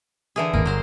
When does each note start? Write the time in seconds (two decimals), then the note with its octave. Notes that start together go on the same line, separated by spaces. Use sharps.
0.36 D3 E3 G#4
0.53 G#1 D#2 A#3
0.66 G1 F#3 C5